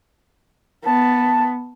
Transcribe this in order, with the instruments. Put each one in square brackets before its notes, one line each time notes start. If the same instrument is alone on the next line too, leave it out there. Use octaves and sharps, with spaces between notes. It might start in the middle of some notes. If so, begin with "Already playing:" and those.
[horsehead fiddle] B3 [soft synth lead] A5